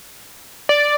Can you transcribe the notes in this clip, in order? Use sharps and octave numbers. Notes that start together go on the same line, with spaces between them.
D5